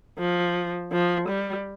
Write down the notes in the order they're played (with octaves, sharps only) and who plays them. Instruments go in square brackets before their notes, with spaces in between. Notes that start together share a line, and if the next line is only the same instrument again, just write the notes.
[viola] F3
F3
G3